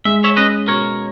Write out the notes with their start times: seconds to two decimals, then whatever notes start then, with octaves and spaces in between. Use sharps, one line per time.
0.05 G#3 E5
0.24 C#5 E5
0.36 C#4 B4 D#5
0.68 B2 A#4 C#5